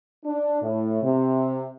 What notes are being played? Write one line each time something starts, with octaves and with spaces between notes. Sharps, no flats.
D4
A2
C3